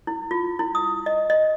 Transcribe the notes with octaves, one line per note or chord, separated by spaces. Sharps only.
E4
F4
E4
D#6
D#5
D#5